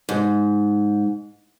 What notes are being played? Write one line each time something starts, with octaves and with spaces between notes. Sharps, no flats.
G#2